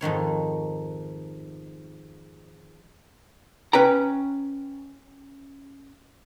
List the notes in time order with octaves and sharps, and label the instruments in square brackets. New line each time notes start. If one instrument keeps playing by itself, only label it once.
[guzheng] F2 G#2 D#3 C#5
[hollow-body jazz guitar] C#4 B4 G5 A#5